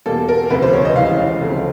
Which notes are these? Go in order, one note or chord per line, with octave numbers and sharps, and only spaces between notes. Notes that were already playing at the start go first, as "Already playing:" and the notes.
E2 B2 G3 A#3 A4
A#4
D2 C3 F3 B4
C5
C#5
D#5
C#2 C#3 E3 G3 F5
D2 C#3 F3 A3 C4